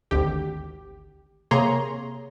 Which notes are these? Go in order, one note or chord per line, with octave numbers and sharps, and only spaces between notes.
G#1 D2 G4
C3 A#3 G#4 C#5 A#5 C6